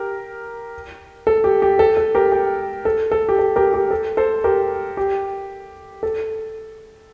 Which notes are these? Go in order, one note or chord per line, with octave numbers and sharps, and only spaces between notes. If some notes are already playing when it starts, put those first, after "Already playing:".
Already playing: G4 A#4
A4
G4
G4
A4
A4
G4 A#4
G4
A4
A4
G4
A4
G4 A#4
G4
A4
A4 C5
G4 A#4
G4
A4